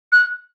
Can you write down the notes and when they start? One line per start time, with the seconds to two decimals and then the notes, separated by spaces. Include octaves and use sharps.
0.12 F#6